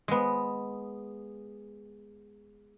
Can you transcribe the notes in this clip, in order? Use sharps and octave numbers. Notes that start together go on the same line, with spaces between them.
G#3 B3